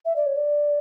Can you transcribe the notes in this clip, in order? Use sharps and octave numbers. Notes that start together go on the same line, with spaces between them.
E5
D5
C#5
D5